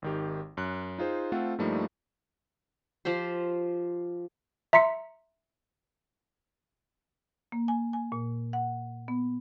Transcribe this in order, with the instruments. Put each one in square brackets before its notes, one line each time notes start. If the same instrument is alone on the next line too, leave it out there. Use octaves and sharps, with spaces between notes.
[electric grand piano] G#1 D#3 G4
F#2 F#6
D#4 F4 G#4 C5
A3 C4 F4 A4 F#5
G2 F3 G3 A3 A#3 D#4
[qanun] F3 F4 G4 C5
[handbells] E5 A#5 C6 B6 C#7
[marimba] A#3
G#5
G#5
A#2
F#5
B3